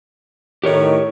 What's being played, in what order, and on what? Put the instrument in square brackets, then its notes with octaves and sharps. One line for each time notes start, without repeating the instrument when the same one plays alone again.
[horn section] A2 D#3 [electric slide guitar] G4 A#4 C#5